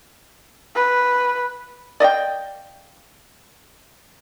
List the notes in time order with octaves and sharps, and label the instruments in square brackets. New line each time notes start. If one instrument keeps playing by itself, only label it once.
[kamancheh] B4
[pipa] D5 D#5 F5 G5